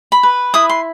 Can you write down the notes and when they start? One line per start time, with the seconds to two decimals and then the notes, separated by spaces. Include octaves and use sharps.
0.12 B5
0.23 B4
0.54 E4 D#6
0.70 C6